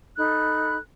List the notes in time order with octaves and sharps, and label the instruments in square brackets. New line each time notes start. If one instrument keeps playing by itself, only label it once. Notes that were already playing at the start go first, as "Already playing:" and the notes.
[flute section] D#4 A4 B5 F#6